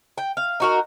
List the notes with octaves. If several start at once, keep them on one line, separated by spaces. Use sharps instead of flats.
G5
F5
D#4 F#4 A#4